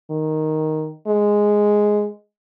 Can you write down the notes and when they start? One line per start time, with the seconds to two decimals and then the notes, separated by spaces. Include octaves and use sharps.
0.10 D#3
1.07 G#3